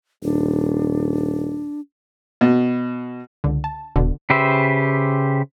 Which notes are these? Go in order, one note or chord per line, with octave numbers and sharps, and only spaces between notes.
D#1 D4
B2
C#2 D3
A5
D#1 B2 D3
C#3 G4 B4 C5 E5